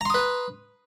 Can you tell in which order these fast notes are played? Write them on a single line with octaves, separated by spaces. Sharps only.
A#5 C6 D#6 B4